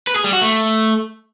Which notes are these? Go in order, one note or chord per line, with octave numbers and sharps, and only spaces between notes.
B4
G#4
G3
F#4
A3